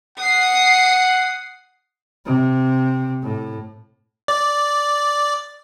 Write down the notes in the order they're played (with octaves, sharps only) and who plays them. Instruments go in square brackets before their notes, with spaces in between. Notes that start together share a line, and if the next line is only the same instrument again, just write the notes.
[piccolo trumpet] F#5 [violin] D#6 C7
[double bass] C3
A2
[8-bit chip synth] D5